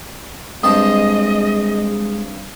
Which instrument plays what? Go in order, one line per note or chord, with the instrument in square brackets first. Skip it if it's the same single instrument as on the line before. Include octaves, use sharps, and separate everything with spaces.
[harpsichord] G2 C4 A5 [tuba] G#3 [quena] D#5 [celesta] D#6